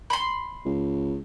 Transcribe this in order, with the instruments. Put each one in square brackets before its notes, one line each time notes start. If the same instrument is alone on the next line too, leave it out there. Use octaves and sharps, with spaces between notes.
[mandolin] B5 C6
[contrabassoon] C#2